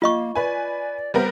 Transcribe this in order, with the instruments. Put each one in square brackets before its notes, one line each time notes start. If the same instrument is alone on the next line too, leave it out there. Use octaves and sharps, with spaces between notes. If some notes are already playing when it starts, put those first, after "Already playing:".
[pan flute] A#3 [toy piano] F4 D#5 C#6
[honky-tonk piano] B4 G#5 [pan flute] D5
[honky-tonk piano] G3 B3 A#4 [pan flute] C5